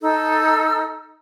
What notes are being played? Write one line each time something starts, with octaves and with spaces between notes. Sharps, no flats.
D#4 A4 E6